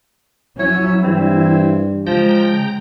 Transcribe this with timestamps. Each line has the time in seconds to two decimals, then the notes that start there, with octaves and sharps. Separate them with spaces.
0.59 F3 F#3 C#4 E4 C#5
1.04 G2 E3 C4
2.07 C#3 F3 G#3 G5 A#5